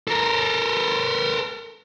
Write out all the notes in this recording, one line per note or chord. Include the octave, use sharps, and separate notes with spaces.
A4 A#4